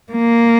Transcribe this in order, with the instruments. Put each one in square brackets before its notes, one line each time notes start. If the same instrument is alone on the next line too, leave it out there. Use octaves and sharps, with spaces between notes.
[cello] A#3